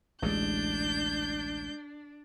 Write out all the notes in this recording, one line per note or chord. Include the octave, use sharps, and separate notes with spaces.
A1 D2 G#3 D4 G6